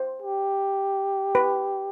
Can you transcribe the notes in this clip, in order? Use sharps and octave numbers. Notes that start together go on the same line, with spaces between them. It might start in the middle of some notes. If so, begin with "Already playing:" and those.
Already playing: C5
G4
B4